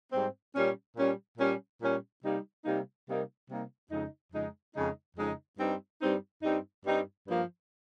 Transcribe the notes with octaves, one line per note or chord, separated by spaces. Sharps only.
G#2 G3 C4
A#2 G3 C#4
A#2 G3 C#4
A#2 G3 C#4
A#2 G3 C#4
C3 G3 A#3 D#4
C3 G3 A#3 D#4
C3 G3 A#3 D#4
C3 G3 A#3 D#4
F2 C#3 G#3 D#4
F2 C#3 G#3 D#4
F2 C#3 G#3 D#4
F2 C#3 G#3 D#4
G2 G3 C4 D#4
G2 G3 C4 D#4
G2 G3 C4 D#4
G2 G3 C4 D#4
G2 F3 A#3